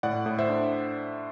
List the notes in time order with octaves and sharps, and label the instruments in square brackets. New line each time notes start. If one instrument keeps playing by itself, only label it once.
[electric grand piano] A2 D5 F#5
A2
C5 E5
D4